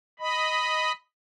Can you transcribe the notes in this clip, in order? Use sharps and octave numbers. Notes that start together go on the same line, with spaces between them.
D#5 B5